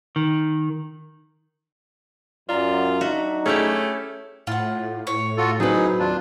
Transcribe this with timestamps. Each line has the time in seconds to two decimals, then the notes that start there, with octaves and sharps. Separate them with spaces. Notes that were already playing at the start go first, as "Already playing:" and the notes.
0.16 D#3
2.49 F#2 F4 D5 A#5
3.01 F#3 D4 D#4 F#4 E5
3.46 A3 C#4 E4 G4 G#4 C#5 C#7
4.47 A2 F4 F#5
5.07 C#5
5.38 F4 F#4 A4
5.60 F#3 C4 D#4 G#4 B4 D#5
5.99 D#2 D4 F4